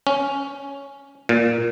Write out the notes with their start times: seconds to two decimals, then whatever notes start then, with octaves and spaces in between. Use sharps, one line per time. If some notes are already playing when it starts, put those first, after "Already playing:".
0.07 C#4
1.29 A#2